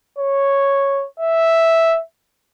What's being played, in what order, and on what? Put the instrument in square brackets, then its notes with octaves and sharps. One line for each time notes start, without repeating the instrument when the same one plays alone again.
[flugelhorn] C#5
E5